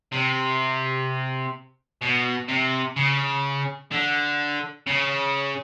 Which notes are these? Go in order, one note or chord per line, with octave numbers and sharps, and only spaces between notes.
C3
B2
C3
C#3
D3
C#3